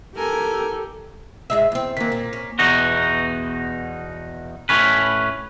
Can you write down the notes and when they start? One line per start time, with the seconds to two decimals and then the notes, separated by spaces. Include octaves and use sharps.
0.16 G4 A4 A#4 G#5
1.50 G#2 G#3 E5
1.72 E2 C4
1.97 D#3 E3 A#3 B6
2.12 A#2
2.33 C#4
2.59 E2 B2 D#4 F#4
4.69 A2 C#4 B4